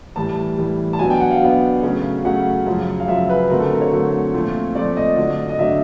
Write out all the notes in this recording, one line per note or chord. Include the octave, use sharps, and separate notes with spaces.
A2 E3 G3 A5
A2 E3 G3
A5
B2 F#3 B3 D4 G#5
G5
F#5
F5
B2 F#3 B3 D4
C#3 F#3 A3 C#4
C#3 F#3 A3 C#4 F#5
F#2 C#3 F3
F5
F#2 C#3 F3 E5
B4
D3 F#3 A3 C4 A#4
A4
A#4
C#5
D3 F#3 A3 C4
A#2 F3 A3 C4
A#2 F3 A3 C4 D5
D#5
D3 F#3 A3 D4
D#5
D3 F#3 A3 D4 E5